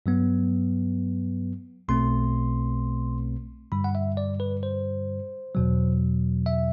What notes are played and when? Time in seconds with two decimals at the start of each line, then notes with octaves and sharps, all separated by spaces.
0.06 G2 F#3 B3
1.88 B1 B2 A3 C4 C6
3.72 G2 D3 G3 B5
3.84 F#5
3.95 E5
4.17 D5
4.40 B4
4.63 C5
5.55 E2 B2 F#3
6.46 E5